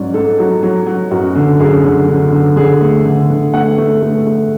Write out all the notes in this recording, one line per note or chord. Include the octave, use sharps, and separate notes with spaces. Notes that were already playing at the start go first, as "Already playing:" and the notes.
Already playing: G#2 F#3 C#4 D5
G#2 A4
F#3
F#3
F#3
F#2 F#4
D3
F#2 G#4
D3
D3
D3
D3 G#4
A3
D3
D3
A3 F#5
A3
A3
A3